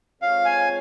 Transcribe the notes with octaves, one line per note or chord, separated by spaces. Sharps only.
G#3 C4 F4 A4 C#5 F5
G#5